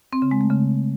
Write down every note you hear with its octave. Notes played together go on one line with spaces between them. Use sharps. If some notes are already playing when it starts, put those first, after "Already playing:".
C4
C#3
G#3
A3
C#3